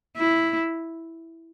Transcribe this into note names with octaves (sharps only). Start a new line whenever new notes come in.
E4